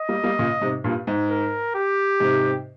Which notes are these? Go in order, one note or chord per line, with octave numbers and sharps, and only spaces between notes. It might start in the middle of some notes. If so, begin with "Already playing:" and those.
Already playing: D#5
G3 A#3
G3 A#3
A#2 C#3
G#2 C3
G2 A#2
G#2
A#4
G4
G#2 C3